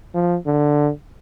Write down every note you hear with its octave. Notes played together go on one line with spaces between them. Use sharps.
F3
D3